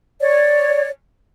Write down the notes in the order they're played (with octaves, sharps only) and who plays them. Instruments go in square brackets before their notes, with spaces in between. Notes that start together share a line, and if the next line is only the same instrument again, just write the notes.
[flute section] C#5 D5